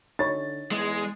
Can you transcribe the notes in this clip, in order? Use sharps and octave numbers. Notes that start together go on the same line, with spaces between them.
D3 D#4 C#5 B5 A6
E2 G#3